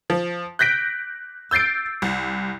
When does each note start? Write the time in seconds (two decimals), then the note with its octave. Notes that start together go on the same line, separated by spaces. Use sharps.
0.10 F3
0.59 F#6 G6 A#6 B6 D7
1.51 E6 G6 A6 C7 D7
2.02 C2